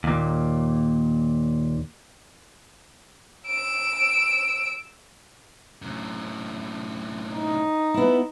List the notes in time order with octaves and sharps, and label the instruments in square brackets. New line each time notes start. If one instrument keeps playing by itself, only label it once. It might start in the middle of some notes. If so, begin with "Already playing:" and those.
[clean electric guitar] D#2 A#2
[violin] E6 D7
[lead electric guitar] F#2 A2
[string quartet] D#4
[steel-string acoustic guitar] B3 E4